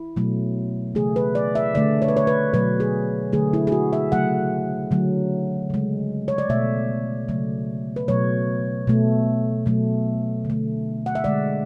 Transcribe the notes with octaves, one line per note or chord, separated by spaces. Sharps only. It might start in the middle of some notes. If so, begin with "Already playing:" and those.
Already playing: E4
B2 F#3 A3
C#3 E3 A3 G#4
B4
D5
E5
D3 A3 D5
C#5
B4
C#5
B4
B2 F#3 A3 B4
G#4
D3 F#3 A3 G#4
E4
G#4
F#4
E5
C#3 F#3 A3 F#5
D3 F#3 A3
C#3 G#3
C#5
D5
B2 A3 E5
C#3 F#3 A3
B4
B2 F#3 A3 C#5
B2 A3
B2 F#3 A3
D3
A3
F#5
E5
D3 G#3 D5